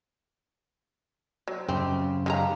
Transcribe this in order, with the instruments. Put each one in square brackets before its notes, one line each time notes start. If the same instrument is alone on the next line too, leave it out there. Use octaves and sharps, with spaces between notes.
[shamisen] F#3 [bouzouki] C4
[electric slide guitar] F#2 C#3 [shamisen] C4 [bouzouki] G4 D#5
[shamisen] D#3 G#3 A#5 [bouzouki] F3 G4 F5